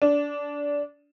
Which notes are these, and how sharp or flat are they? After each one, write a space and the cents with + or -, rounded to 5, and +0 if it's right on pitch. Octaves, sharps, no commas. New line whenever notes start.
D4 -20